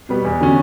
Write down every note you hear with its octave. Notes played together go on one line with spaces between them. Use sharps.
B2 G3 B3
E2
D3 F#3 C#4